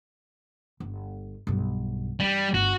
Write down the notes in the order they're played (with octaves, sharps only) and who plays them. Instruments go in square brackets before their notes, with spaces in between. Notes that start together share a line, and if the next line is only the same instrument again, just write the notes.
[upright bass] G1
B1 G2
[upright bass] G2 E3 [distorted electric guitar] G3
[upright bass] G1 [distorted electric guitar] F#4